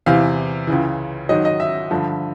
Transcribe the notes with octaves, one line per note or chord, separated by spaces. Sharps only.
E2 C3 E3 F5
C#2 C#3 E3
G#2 D#3 F#3 D#5
D#5
E5
G2 D3 F3